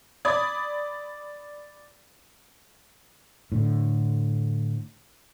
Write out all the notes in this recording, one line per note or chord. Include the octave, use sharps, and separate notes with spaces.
D5 B5 D#6 G#6
A2 D3